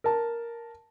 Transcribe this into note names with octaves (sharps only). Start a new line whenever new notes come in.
A#4 A5